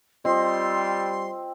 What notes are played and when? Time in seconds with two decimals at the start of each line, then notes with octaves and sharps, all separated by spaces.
0.25 G3 C4 F4 D#5 C6